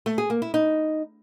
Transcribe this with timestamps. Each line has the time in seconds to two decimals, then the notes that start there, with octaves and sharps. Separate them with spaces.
0.06 A3
0.18 G#4
0.30 A#3
0.42 E4
0.54 D#4